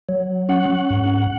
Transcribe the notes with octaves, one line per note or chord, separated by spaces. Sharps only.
F#3
C#4 F#5
G#2